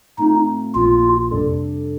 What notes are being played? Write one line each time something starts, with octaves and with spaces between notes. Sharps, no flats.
A2 A3 C4 D#4 F4
A#1 A#2 F3 A#3 F4
F2 C3 G3 D4 A4